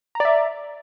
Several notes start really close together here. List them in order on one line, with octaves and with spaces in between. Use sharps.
A#5 D5 E5